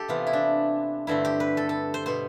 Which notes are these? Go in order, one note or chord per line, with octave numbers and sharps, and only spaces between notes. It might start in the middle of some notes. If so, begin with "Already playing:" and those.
Already playing: G4 A4
C3 E3 B3 F4
E4
D4
G2 D3 A3 C4 E4
G4
B4
A4
A4
C5
B2 B3 C5